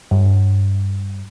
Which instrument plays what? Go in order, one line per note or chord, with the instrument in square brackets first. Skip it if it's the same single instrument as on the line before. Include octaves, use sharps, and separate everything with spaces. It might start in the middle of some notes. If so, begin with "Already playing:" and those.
[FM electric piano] G2